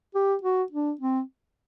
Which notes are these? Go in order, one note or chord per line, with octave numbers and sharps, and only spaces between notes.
G4
F#4
D4
C4